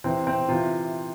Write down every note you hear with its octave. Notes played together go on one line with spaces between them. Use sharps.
C3 E3 C4
C4
C3 E3 F4